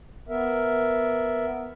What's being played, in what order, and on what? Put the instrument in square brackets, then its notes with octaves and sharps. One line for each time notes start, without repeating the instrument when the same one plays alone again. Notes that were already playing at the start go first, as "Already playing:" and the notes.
[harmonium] B3 A#4 E5